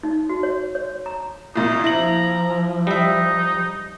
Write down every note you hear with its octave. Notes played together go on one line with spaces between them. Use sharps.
D#4
F#4
C#5
C#5
A#5
C2 A#2 D#4
F3 E4 A#5 F#7
G3 D#4 E5